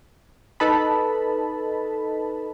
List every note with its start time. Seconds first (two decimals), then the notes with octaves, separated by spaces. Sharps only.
0.60 D#4 A4 B4 D#5 A5 B5